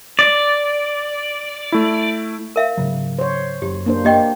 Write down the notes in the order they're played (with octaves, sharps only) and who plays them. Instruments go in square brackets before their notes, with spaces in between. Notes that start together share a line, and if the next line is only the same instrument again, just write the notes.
[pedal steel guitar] D5
[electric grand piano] A3 E4
[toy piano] A#4 E5 F5
[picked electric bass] G#2 C#3 F#3
[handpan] C5 C#5
[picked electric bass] F#1 F#2 [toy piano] G4
[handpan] A#3 D4 C5
[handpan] A#3 [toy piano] G4 D#5 G5